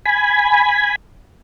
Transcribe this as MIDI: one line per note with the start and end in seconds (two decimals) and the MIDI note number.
0.06 0.96 80
0.06 0.96 83